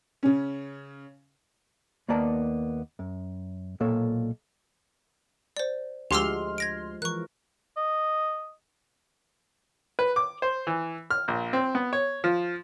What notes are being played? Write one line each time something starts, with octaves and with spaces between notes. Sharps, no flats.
C#3 C#4
D#2 A#3 B3 D5 A5 A#5
F#2
B1 A#2 A#3 A4 C#5
C5 D5
D2 F3 G#3 G4 C6 D6 E6 F6
G#6 A#6 D7
E3 F3 A#4 C#6 F#6
D#5
B4
D6
C5
E3
F6
A#1
C4
B3
C#5
F3